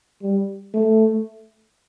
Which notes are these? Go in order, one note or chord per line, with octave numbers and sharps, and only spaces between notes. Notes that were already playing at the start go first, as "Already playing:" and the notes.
G3
A3